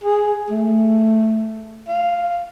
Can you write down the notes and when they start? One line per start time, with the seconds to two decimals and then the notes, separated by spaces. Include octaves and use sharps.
0.04 G#4
0.50 A3
1.88 F5